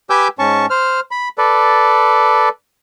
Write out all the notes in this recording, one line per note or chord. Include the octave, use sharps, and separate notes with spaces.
G4 B4 G#5 D6 E6 G6
G#2 C#4 A5 C#6
C5 F6
B5
A4 B4 D5